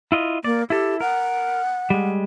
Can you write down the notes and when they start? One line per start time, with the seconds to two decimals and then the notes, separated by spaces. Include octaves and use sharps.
0.12 E4 F4 D#5
0.44 A#3 D5
0.70 E4 G4 A4
1.01 A#4 F#5
1.90 G3 G#3